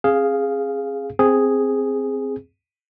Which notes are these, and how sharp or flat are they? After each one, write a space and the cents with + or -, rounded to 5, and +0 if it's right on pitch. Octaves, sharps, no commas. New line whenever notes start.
C4 +40 G#4 +0 F5 +0
C4 +0 G#4 +0